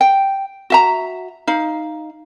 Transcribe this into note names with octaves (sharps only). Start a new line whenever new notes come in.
G5
F#4 E5 A#5
D#4 F5